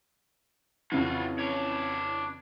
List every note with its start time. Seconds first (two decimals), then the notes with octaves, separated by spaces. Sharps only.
0.92 F2 C#3 E3 F4 F#4
1.39 D4 C#5